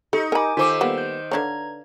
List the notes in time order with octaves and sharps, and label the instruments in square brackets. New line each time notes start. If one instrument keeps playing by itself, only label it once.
[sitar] D#4 [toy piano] G4 E6 [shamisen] A4
[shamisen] A#4 B5 [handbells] G#5 D6
[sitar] D#3 C5 [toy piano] D#4 G#5 D6 [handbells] F4 A4
[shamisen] G3 A#3 B3
[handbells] G6
[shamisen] D3 D4 C#5 [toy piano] B4 F5 [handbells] A#5 G#6